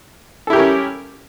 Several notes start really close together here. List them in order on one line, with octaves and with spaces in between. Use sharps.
A4 E4 G4 A#4 C#4